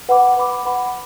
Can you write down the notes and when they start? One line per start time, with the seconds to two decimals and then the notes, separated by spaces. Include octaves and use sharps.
0.09 B4 F#5 B5 D6
0.37 B4 F#5 B5 D6
0.65 B4 F#5 B5 D6